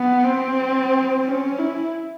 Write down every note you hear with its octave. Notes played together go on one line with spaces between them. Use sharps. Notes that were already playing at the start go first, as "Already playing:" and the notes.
Already playing: B3
C4
C#4
E4